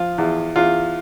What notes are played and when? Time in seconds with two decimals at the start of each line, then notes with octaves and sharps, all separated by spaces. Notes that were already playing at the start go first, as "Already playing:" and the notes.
Already playing: F3 F4
0.18 E2
0.56 E2 F4